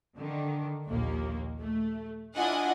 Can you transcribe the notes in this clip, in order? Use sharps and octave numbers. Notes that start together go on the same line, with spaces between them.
D3 D#3
A#1 D#2 A#3
A3
D4 E4 F4 D#5 F#5 G#5